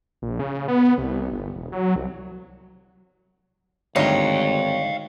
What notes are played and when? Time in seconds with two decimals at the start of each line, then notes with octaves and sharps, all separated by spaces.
0.22 A#1
0.40 C#3
0.68 B3
0.98 C2
1.31 G1
1.56 E1
1.72 F#3
1.96 C2
3.96 G#1 D2 G2 D#4 C#5 F5 G5